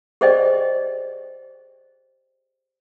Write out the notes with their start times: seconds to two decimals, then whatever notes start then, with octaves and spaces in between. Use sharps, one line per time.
0.21 G4 G#4 C5 D5 D#5 G5